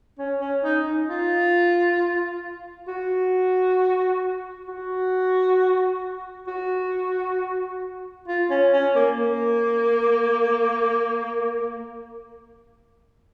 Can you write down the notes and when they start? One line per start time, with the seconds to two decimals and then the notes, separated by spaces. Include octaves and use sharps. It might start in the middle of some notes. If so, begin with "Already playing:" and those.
0.19 C#4
0.41 C#4
0.64 D#4
0.86 D#4
1.09 F4
2.88 F#4
4.68 F#4
6.47 F#4
8.27 F4
8.50 C#4
8.73 C#4
8.95 A#3
9.18 A#3